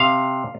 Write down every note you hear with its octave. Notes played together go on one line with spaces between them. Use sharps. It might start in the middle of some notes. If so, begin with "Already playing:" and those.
Already playing: C3 F5